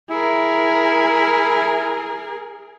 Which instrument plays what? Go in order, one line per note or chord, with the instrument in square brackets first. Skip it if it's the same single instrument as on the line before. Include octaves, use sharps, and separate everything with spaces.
[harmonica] E4 [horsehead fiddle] G#4 A#4